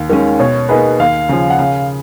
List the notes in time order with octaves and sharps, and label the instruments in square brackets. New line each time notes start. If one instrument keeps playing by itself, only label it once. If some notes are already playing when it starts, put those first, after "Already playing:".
Already playing: [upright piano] D#2
D#3 G#3 C#4
[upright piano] B2 [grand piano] C#5
[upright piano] A#3 D#4 G#4 [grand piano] B4
[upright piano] D#2 [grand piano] F5
[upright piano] C#3 F3
[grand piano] F#5
[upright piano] C#3 [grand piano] F5